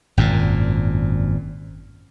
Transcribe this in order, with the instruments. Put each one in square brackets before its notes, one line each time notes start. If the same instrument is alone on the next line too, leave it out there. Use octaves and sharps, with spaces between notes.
[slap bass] G#1 F#2 A#2